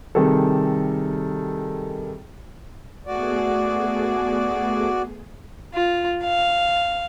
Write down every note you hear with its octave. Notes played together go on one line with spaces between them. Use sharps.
C3 D#3 G3 G#4 A4
A3 B3 F#4 G#4 D5
F4
F5